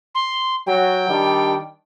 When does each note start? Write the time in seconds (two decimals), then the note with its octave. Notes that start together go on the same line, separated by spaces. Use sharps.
0.15 C6
0.67 F#3 G5
1.08 D#3 G3 D4